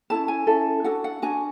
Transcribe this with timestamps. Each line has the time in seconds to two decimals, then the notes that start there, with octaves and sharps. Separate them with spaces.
0.10 C#4 E4 A4 A5
0.28 G#5
0.47 C#4 E4 A4
0.84 D4 F#4 A4 F#5
1.04 F#5
1.22 D4 F#4 G#5